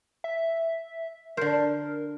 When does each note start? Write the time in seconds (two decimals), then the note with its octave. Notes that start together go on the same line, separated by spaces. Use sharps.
0.24 E5
1.37 D3 A#4 C5